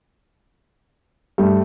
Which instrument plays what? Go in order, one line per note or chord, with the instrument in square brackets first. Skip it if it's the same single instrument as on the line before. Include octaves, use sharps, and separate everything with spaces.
[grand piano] G2 [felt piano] G3 A3